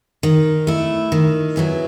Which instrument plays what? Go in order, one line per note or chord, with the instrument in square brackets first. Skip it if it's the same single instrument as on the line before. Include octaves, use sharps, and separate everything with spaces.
[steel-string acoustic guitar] D#3
A3 E4
D#3
F#3 B3 E4 G#4